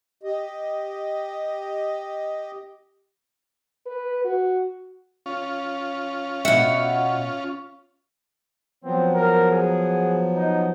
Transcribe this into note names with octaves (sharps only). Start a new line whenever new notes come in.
G4 D#5
B4
F#4
C#4 F4
B2 E5 F#5
F3 F#3 B3 C4
A#4
G#4
D#4